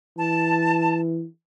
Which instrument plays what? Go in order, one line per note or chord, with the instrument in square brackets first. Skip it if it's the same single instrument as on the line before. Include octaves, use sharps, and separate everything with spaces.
[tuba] E3 [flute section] A5